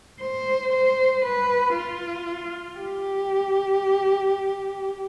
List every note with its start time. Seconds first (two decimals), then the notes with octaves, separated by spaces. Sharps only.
0.22 C5
0.73 C5
1.24 B4
1.76 F4
2.78 G4